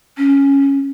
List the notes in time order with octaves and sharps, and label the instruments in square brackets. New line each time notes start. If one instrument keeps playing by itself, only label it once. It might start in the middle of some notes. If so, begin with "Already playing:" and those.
[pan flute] C#4